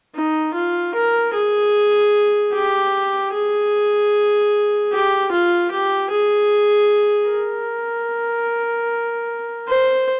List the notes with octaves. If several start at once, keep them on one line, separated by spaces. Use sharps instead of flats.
D#4
F4
A#4
G#4
G4
G#4
G4
F4
G4
G#4
A#4
C5